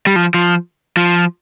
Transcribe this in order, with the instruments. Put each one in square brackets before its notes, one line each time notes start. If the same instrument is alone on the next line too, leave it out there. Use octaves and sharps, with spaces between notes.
[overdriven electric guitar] G3
F3
F3
F3